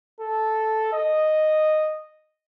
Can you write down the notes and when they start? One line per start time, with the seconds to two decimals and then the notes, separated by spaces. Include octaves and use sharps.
0.20 A4
0.93 D#5